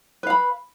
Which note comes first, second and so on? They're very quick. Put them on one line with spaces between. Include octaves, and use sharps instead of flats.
B4 F5 B5